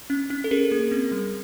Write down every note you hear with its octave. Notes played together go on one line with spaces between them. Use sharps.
C#4
C#4
A4
C#4 G#4 A#4
A#3
C4
G3